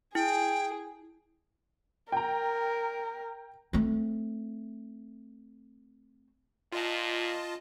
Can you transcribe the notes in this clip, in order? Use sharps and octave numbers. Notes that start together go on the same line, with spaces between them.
E4 G#4 G5
A#4 G5 A#5
A3 C4
A#2 F4 D#5 A5